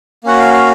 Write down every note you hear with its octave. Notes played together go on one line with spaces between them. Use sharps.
A#3 C#4 F#4 F#5
F5
F5